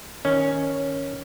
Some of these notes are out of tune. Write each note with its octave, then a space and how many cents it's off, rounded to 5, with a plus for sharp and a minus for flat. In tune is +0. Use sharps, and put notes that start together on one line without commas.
D#3 +10 C#4 +0